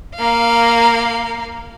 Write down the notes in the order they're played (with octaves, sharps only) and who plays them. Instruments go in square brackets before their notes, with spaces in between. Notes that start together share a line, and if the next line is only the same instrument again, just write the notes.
[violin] A#3 F5